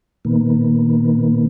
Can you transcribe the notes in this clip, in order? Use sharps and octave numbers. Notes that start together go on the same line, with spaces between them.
A#2 D#3 A#3 B3